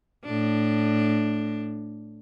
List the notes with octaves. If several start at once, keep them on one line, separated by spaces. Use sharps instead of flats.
A2 D4